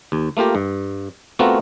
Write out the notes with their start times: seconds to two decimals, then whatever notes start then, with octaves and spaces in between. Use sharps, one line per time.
0.12 D#2
0.37 A3 A#3 F4 G4 A#4
0.55 G2
1.39 A3 B3 C4 F4 F#4 A#4